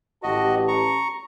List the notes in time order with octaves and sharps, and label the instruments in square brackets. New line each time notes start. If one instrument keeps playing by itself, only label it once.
[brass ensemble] A1 G4 A5 [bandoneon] F#4 D#5
[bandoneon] A#5 C#6